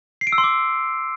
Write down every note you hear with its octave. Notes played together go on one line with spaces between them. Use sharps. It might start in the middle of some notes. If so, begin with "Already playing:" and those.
C7
D7
E6
C6
D6